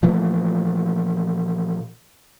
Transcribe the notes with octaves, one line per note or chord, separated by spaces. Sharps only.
A#2 E3 F3 A3